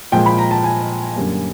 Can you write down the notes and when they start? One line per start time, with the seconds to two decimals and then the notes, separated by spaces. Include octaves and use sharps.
0.12 A#2 F3 G#3 G5
0.26 B5
0.38 A#5
0.51 A5
0.64 G#5
1.16 F#2 D3 G3 A#3